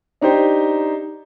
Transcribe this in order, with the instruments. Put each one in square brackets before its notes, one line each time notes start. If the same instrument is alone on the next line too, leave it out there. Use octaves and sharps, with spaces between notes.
[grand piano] D4 D#4 G4 C5